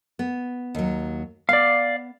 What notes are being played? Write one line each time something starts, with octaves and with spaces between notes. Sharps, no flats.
B3
D#2 F#3
B3 D5 F5